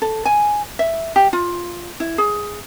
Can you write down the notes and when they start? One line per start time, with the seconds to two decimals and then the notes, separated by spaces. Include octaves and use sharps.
0.02 A4
0.25 G#5
0.79 E5
1.16 G4
1.33 F4
2.00 E4
2.18 G#4